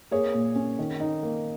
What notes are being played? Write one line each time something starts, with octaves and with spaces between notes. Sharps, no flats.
A#3 G#4 C#5
A#2
C#4
D#3
D#4
A#3